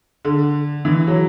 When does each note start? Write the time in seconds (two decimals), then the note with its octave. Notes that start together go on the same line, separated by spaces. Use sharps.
0.25 D3
0.85 E3
1.07 F#3